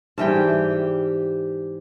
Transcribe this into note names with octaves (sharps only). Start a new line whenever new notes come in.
G#2 E3 G3 G4 G5 A5